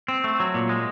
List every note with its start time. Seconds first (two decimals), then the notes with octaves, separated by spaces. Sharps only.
0.08 C4
0.24 A3
0.40 F#3
0.54 A#2
0.69 G#3